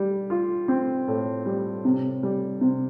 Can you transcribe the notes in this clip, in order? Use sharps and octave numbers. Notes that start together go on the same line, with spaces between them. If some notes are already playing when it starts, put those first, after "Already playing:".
Already playing: G3
F4
C4
A2
G3
C3
G3
C3